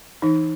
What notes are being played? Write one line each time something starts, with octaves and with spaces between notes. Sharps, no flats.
E3 D#4